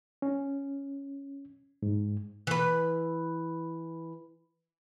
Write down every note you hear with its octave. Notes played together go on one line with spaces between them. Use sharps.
C#4
G#2
E3 B4